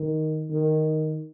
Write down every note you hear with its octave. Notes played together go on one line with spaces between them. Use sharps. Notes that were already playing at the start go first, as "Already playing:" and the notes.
Already playing: D#3
D#3